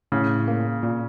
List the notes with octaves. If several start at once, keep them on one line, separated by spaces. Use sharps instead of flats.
A2 C#3
A#3
A#2